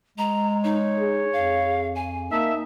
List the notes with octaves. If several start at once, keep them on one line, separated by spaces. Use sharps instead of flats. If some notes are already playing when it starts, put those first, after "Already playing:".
G#3 A#5
D#4 C#5
G#4
F2 F5
G#5
A#3 D#4 E5 A5